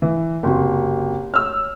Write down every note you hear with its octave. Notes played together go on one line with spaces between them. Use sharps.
E3
F#1 C3 F#4 G4 G5
C#5 E6 F6